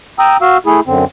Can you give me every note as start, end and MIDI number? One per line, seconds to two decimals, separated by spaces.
0.19 0.37 79
0.19 0.37 82
0.19 0.37 87
0.19 0.37 88
0.42 0.58 66
0.42 0.58 77
0.42 0.58 88
0.66 0.80 57
0.66 0.80 64
0.66 0.80 68
0.87 1.05 42
0.87 1.05 50
0.87 1.05 60